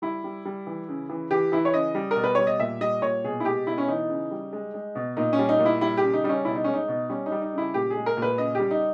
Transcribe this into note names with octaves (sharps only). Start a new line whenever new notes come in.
G3 E4
G3
G3
E3
C#3
E3
E3 G4
E3 E4
C#5
C#3 D#5
G3
A#4
B2
B4
G3 C#5
D#5
A#2 E5
G3 D#5
A#2 C#5
B2 G#4
E4
G#3 G4
B2 E4
C#4
E3 D#4
C#3
G3
G#3
G#3
B2
A#2 D#4
C#4
G3
D#4
A#2
E4
G3 E4
G4
C#3
D#4
G3 D#4
C#4
B2 E4
D#4
G#3 C#4
D#4
B2
G3 C#4
D#4
G3
D#4
C#3 E4
A#2 G4
G#4
G#3
A#4
A#2
B4
C#3 D#5
G3 G4
D#4